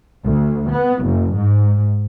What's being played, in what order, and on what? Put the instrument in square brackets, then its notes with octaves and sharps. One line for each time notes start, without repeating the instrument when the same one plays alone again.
[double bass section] D2
B3
F#1
G#2